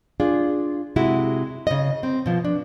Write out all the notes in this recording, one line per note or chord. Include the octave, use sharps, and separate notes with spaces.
D4 F4 G#4
C3 G#3 E4 F#4
C#3 D#5
C4
B2 F3
D4